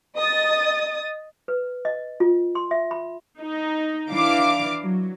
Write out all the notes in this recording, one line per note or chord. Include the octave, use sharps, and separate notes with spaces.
D#5 D#6 A6
B4
D#5
F4
C6
E5
B5
D#4
E3 D4 F5 D6
F#3